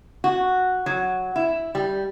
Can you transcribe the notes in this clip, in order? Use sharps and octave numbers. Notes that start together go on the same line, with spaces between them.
F#4
F#3
E4
G3